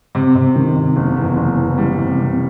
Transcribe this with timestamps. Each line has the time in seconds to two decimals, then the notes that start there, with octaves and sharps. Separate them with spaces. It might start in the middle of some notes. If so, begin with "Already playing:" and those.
0.15 C3
0.35 C3
0.56 D#3
0.76 C3
0.96 F#1
1.17 E2
1.37 F#1
1.58 E2
1.78 G3
1.98 C3
2.19 C3